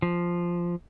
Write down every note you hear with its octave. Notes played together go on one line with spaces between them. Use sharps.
F3